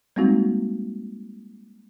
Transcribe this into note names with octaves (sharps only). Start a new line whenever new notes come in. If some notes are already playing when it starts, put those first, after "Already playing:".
G3 G#3 A#3 C4 D#4 F#4